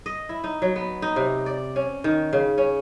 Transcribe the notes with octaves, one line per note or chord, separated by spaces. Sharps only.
D#5
E4
D#4
F#3
B3
D#4
C3
D5
C#4
D#3
C#3
C#4